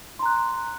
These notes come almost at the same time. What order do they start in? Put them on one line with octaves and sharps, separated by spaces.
C6 A#5 F#6